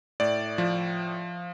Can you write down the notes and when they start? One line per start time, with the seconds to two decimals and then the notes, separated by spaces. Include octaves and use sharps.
0.20 A2 D5
0.58 F3